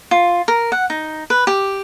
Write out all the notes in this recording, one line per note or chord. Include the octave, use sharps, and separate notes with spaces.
F4
A#4
F#5
D#4
B4
G4